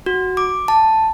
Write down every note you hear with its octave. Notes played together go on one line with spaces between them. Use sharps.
F#4
D6
A5